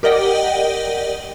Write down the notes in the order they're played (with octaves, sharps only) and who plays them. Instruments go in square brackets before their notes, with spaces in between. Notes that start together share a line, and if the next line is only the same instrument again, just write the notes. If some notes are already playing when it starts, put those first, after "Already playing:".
[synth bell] G4 A#4 D5 D#5 F#5 G5